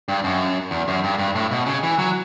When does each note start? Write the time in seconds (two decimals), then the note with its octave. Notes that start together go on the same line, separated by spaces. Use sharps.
0.08 G2
0.24 F#2
0.71 E2
0.88 F#2
1.04 G2
1.19 G2
1.35 A2
1.51 B2
1.66 C#3
1.83 E3
1.99 F#3